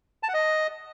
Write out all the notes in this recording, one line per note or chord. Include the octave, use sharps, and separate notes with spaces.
A5
F#5
D#5